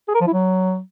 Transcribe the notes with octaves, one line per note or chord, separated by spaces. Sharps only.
G#4
A#4
F3
E4
F#3